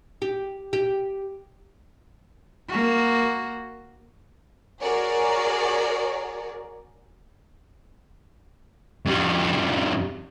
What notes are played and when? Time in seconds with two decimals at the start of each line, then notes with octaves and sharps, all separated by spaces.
0.22 G4
0.73 G4
2.69 A#3 F#4
4.81 F#4 G#4 A#4 C#5 D5
9.05 F2 G3